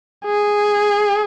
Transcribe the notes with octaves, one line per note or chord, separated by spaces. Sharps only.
G#4